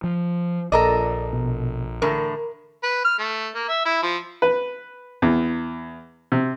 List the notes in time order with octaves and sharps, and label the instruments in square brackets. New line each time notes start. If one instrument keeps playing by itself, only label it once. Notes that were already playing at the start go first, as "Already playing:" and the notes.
[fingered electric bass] F3
[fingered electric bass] A#1 [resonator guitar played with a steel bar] A4 A#4 D#5 [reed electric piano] D5
[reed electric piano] B2
[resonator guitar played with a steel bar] A2 D3 E3 [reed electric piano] A#4
[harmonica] B4
F6
A3
A#3
E5
E4
F3
[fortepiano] B4
E2
C3